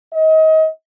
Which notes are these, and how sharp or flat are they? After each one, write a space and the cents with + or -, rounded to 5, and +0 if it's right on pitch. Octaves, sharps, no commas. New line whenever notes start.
D#5 +30